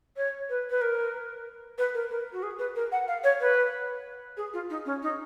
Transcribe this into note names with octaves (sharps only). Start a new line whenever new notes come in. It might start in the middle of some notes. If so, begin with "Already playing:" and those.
C#5
B4
B4
A#4
B4
A#4
A#4
F#4
G#4
B4
A#4
F#5
F5
C#5
B4
G#4
F4
D#4
C#4
D#4